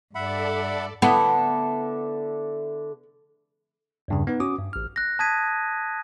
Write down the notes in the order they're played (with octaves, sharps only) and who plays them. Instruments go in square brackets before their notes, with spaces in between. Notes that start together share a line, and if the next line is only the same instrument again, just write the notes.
[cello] G2 [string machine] A4 D5 [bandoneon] E5 F#5 B5
[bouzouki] D3 E4 A4 [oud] B3
[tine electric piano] E2 G2 C#3
B3 D#4 B4
C#4 F#4 D6 D#6
G2
A1 F6
[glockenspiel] F#6 A#6
A5 D#6 G#6 B6 D#7